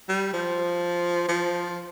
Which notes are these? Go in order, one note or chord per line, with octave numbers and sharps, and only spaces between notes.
G3
F3
F3